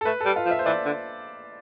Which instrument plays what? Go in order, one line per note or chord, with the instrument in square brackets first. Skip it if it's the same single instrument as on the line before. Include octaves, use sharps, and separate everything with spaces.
[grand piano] A4
[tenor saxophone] A3 [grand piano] B4
[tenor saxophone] G3 [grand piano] A4
[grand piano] F4
[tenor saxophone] F3
[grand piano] E5
C5
[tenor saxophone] E3 [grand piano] D5
[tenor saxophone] D3